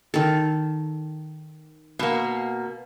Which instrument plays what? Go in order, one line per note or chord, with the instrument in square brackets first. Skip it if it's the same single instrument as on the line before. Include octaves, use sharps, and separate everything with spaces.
[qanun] D#3 A4
[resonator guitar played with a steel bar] B2 A#3